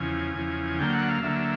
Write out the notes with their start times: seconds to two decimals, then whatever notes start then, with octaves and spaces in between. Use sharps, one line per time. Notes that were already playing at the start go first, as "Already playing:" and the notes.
Already playing: E2 C#3 F3 G#5
0.35 E2 C#3 F3
0.78 D2 D3 F#3 A#3 G5
0.93 F#5
1.08 F5
1.22 D2 D3 F#3 A#3 E5